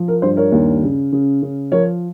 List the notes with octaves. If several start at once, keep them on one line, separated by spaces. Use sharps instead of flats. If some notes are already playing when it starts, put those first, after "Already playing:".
Already playing: F3
A#4
G2 C5
A#4 C#5
D#2
C#3
C#3
C#3
F3 A#4 C#5